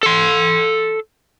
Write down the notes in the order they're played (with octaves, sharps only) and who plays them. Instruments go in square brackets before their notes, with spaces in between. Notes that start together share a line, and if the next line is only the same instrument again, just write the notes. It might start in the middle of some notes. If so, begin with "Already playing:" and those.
[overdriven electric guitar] A4 C6